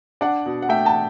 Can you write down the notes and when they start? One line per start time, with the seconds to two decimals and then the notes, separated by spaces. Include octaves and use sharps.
0.21 D4 D5 F#5
0.46 B2
0.62 F#5
0.69 A3 E5 G5
0.85 F#5 A5